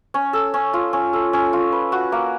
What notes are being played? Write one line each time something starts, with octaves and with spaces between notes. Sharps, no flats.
C#4
A4
C#4
F4
C#4
A4
C#4
F4
B4
F#4
A#3